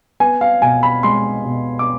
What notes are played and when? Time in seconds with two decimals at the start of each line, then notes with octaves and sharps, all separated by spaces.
0.20 B3 G#5
0.41 F5
0.62 B2 G#5
0.83 B5
1.03 G#3 C6
1.45 B2
1.79 D6